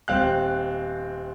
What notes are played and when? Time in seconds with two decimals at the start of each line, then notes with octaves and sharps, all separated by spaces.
0.08 D#1 C4 F5 F#6